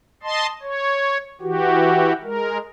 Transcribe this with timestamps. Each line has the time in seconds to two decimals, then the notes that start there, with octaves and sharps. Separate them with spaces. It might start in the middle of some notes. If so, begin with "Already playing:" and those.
0.23 D#5 A5 C6
0.62 C#5
1.41 E3 F#4 G4
2.23 G#3 A#4